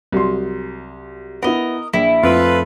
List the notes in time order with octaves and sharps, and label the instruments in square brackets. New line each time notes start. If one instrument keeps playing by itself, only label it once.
[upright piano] C2 F#3 C6
[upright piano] B3 E4 [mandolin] A#4 D#5
[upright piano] A#1 [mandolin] E4
[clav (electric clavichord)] F2 [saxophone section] A3 F4 B4